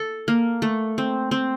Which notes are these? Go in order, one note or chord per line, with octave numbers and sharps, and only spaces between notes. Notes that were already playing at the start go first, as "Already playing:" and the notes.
Already playing: A4
A#3
A3
C4
C4